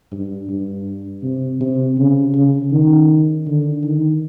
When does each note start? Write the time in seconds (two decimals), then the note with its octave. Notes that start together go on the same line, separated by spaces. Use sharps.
0.12 G2
0.49 G2
1.23 C3
1.61 C3
1.98 C#3
2.35 C#3
2.72 D#3
3.47 D3
3.84 D#3